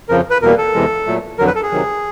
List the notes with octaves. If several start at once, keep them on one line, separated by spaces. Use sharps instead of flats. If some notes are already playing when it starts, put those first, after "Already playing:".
F2 C#3 F3 A#4
B4
E2 B2 G3 A#3 A#4
A4
E2 C3 E3 G#3
A#2 F#3 A3
F2 D3 F#3 A#4
B4
A4
G#4
C3 D#3 F#3